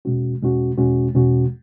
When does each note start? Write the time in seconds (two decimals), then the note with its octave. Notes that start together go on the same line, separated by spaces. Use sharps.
0.05 E2 B2 G#3 C#4 F#4
0.41 E2 B2 G#3 C#4 F#4
0.78 E2 B2 G#3 C#4 F#4
1.15 E2 B2 G#3 C#4 F#4